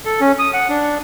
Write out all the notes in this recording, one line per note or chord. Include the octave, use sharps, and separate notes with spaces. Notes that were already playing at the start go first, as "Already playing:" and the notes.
A4
C#4
D#6
F#5
D4